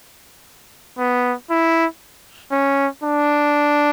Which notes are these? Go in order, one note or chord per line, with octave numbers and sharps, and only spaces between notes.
B3
E4
C#4
D4